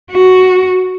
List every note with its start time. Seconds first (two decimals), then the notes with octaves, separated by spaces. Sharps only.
0.11 F#4